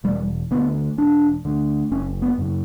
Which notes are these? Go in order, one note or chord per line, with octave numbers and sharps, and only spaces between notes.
E1 G3
D2 D3 B3
E1 D4
D2 D3
F#1 C#4
B3
F#2 C#3